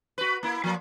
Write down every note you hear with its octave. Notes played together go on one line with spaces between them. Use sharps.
F#4 B4
A#3 E4
F3 A#3